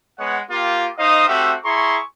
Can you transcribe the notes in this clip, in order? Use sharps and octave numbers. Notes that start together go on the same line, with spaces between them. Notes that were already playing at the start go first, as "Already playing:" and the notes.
G#3 B3 C#5 F#5
A#3 F4 G4
D#4 C5 D#5 F5 D#6
A3 C4 F#4 G4 E5 F#5
E4 G#4 A#5 C6 C#6